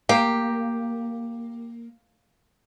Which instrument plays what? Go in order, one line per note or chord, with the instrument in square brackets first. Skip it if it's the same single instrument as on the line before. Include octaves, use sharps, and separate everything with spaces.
[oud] A#3 [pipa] G4